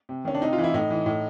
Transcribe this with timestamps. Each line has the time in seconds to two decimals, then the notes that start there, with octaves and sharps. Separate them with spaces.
0.09 C3
0.25 D#3 C#4
0.35 D4
0.41 C3 D#4
0.53 F4
0.58 E3
0.64 E4
0.74 A2 D#4
0.90 E3
1.06 A2